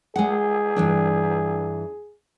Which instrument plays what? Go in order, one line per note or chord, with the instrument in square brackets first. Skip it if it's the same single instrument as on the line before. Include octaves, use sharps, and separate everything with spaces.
[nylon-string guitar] G#3 F#5 [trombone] G#4
[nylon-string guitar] G2 E3 D4